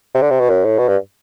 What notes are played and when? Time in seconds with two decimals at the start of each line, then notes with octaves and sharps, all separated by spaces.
0.14 C3
0.22 D3
0.31 C3
0.40 B2
0.50 F#2
0.65 A2
0.78 B2
0.88 G2